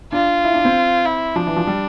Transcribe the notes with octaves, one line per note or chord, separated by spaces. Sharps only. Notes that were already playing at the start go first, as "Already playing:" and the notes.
D4 F4
E4
D4
C4
E4
F3 D4
E3
F3
G3